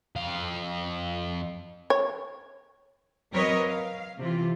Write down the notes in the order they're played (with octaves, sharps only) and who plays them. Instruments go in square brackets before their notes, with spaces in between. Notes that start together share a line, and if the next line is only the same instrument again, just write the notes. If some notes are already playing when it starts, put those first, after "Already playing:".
[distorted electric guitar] F2 F5
[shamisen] C#5
[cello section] F#3 C4 A#4 B4 C#5 D#5
F5
C3 E3 F4